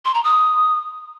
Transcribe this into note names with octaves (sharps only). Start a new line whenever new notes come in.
C6
A#5
D#6